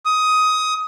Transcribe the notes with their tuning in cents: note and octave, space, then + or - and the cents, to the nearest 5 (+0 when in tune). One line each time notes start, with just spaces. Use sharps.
D#6 +15